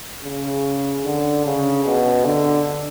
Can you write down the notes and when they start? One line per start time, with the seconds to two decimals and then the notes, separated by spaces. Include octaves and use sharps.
0.24 C#3
1.04 D3
1.45 C#3
1.85 B2
2.25 D3